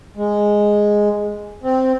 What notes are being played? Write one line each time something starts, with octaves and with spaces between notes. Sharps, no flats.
G#3
C4